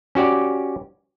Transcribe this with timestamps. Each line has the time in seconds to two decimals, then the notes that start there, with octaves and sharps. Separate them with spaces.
0.15 C#4 F#4 G4 D5